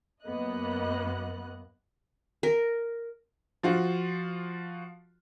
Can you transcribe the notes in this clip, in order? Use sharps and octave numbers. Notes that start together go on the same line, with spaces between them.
F#2 A#3 B3 D#5 F#6
A#4
F3 F4 F#4